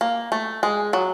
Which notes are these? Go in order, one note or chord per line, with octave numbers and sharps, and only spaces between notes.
A#3
A3
G#3
F#3